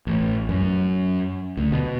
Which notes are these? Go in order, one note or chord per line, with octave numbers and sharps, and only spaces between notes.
A1
F#2
D2
B2